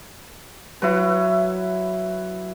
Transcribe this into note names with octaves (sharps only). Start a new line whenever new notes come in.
F#3 E4 F#4 B4